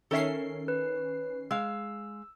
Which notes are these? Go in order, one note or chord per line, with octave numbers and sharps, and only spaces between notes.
D#3 C#4 A4 A#4 E5 C7
B4
G#3 F5 E6